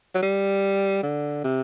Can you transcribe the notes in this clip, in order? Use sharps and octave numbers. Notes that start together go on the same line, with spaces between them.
F#3
G3
D3
C3